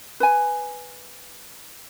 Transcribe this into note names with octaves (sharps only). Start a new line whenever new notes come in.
B4 G#5